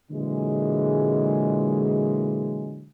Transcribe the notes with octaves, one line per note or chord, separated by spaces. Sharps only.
A#2 D3 E3 F#3 G#3